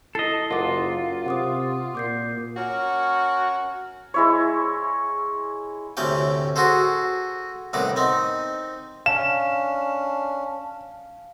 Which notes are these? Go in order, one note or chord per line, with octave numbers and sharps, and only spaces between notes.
E4 A4 D#5 A6 C7
F#1 F4 A#4 F#5 D6
F#2
C3 F#5 D6 D#6
A#2 D6 G6 C7
C#4 F#4 A#4 C#5
G#3 E4 C#5
D2 A2 C3 C#4 G4 G5
F#4 G#4 A4 C5
C2 A2 D#3 B3 D6
C4 D#4
C#4 D4 F5 E7